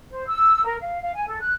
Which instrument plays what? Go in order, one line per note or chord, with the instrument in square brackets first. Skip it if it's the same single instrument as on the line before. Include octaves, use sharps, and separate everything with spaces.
[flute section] C5
E6
A#4
F5
F5
G#5
A4
F#6